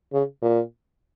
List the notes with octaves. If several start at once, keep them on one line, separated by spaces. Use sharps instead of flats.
C#3
A#2